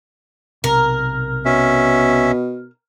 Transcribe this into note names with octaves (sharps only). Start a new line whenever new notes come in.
B1 C3 A#4
B2 C#4 E5